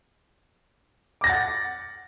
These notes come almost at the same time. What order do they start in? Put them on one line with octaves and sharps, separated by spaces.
D6 A#6 A6 F#5